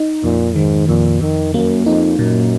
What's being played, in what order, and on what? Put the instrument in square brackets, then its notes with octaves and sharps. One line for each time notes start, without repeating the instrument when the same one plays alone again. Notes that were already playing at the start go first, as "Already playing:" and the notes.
Already playing: [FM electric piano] D#4
[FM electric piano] F2 [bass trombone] A#2
[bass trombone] G#2 [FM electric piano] D#3
[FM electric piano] F2 [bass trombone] A#2
[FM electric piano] F2 [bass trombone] D#3
[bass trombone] F#2 [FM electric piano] A#3
[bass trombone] F2 [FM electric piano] D#4
[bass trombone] F#2 [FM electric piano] A#2